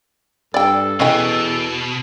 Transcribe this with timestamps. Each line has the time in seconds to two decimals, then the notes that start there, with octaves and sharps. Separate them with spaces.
0.54 G2 A4 D5 G5
1.00 E2 B2 C#4 D#5 G5